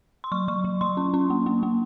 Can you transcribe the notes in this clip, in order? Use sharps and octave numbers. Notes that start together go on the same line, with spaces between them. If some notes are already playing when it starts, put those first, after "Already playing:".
C6
F#3 C#6
F#3 C#6
F#3
F#3 C6
C#4
C#4
A#3
A#3
A#3